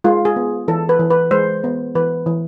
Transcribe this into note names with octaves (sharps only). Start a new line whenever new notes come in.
G#3 F4
G#4
B3
E3 A4
B4
E3
B4
G#3 C5
B3
E3 B4
E3